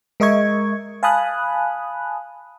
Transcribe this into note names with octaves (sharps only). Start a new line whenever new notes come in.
G#3 A#4 D#5 E5 C#6 G#6
F5 G#5 A5 B5 D#6 F#6